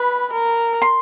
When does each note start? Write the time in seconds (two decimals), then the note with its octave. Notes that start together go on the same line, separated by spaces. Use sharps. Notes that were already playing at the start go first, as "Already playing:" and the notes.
Already playing: B4 B5
0.32 A#4
0.82 C6